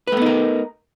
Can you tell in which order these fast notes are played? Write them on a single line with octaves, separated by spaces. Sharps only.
B4 A3 B3 D#4 A#4